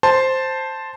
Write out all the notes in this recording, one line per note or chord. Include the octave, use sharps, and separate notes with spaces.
C5 A5 C6